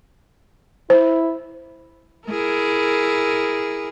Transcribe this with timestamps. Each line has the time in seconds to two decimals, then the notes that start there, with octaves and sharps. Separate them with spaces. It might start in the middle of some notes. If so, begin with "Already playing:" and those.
0.90 E4 C5
2.28 E4 G#4 A#4